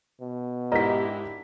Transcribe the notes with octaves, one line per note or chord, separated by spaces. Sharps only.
B2
G#2 D4 E4 G4 A#4 D#5 A#5 B6